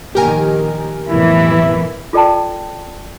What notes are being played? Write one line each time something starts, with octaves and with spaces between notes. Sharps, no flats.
A#1 D#3 G4 A#4 G#5
B1 F2 A2 E3 E4
F4 A4 D5 G5 A5